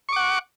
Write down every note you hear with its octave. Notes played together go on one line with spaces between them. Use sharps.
F#5 C#6 D6